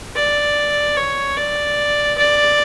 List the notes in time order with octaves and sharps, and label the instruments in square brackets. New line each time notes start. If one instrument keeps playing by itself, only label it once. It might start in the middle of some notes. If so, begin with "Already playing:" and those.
[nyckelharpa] D5
C#5
D5
D5